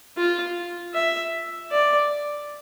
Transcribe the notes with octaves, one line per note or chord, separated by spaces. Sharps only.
F4
E5
D5